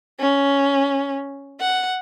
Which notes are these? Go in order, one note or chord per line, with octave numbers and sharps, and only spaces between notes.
C#4
F#5